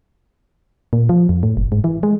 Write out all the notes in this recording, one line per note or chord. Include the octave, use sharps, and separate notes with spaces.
A#2
F3
F2
A2
F#1
G#2
E3
G#3